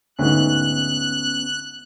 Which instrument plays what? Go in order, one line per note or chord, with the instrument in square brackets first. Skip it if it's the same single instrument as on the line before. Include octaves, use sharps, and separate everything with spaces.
[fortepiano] D2 G#2 [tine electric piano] B3 C#4 [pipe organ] F#6